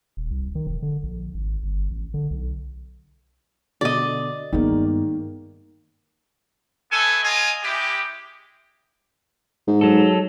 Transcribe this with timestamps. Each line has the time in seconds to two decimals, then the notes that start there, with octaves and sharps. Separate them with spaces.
0.17 D#1
0.30 C2
0.55 D#3
0.67 E1
0.82 D3
1.03 A#1
1.34 G#1
1.63 G1
1.91 A1
2.14 D3
2.31 B1
3.81 B2 D3 D5 D#5
4.53 G2 D#3 G#3 A#3 B3
6.91 A3 B3 A4 G#5
7.23 F4 D#5 G#5
7.63 G#3 E4 G4
9.67 G#2
9.81 F#3 A4